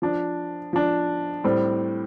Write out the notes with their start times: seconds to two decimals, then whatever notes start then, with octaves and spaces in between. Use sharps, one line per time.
0.02 F3 D4
0.73 F3 D4
1.44 A2 G3 C4